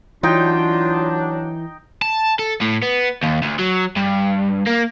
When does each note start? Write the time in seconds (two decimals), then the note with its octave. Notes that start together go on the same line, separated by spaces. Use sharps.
0.23 E3 F#3 D4 D#4 F4 G5
2.02 A5
2.39 A4
2.61 A2
2.82 B3
3.23 D#2
3.42 D2
3.59 F#3
3.96 G2
4.66 A#3